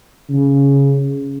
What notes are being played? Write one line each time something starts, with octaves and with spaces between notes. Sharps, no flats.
C#3